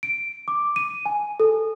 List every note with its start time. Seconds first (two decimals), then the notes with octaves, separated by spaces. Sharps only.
0.03 D7
0.48 D6
0.76 D#7
1.06 G#5
1.40 A4